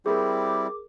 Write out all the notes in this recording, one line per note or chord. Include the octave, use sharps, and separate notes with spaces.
G3 C4 E4 G#4 A#4 D6